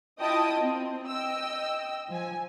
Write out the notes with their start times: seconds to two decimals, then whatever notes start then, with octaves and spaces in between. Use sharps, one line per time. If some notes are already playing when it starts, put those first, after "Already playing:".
0.20 E4 F4 D#5 G5 A5 D#6
0.60 C4
1.07 D#5 G5 E6
2.09 F3 G#5